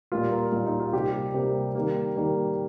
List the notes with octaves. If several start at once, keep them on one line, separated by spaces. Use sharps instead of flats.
A#2 G3 A#3 F4
A#4
A#2 G3 A#3 F4
D#4
F4
C3 G3 A#3 G4
C3 G3 A#3
D#3 G3 A#3
D#3 G3 A#3